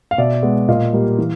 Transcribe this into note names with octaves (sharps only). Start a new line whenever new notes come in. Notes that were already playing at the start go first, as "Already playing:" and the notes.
F5
B2 D5 E5
G#3 B3
A#2 D#5 F5
G3 A#3
E3